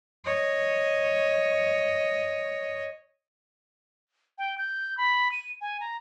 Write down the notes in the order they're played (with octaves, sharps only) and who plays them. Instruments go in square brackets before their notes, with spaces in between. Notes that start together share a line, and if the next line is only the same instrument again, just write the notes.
[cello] C#5 D#5
[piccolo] G5
G6
B5
D#7
G#5
A#5